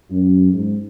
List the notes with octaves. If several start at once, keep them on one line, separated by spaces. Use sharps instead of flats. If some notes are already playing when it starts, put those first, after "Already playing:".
F#2
G#2